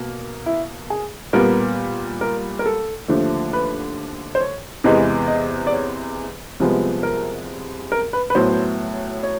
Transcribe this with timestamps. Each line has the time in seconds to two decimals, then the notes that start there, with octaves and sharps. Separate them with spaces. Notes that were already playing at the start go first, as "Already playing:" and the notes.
Already playing: B2 A#3
0.46 E4
0.90 G#4
1.33 A#2 G3 B3 A#4
2.21 A#4
2.59 A#4
2.66 A4
3.08 D#2 D3 F3 A3
3.53 B4
4.35 C5
4.41 C#5
4.84 E2 C3 E3 G#3 B3 D#5
5.28 D#5
5.67 D5
5.73 C#5
6.60 C2 C3 F3 G#3 B3
7.03 A#4
7.92 A#4
8.13 B4
8.30 B4
8.35 A2 F#3 B3 C5
9.23 C#5